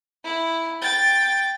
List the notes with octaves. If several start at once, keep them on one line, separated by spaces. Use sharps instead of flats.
E4
G5 A6